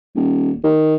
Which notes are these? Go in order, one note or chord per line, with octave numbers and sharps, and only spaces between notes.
D#1
D#3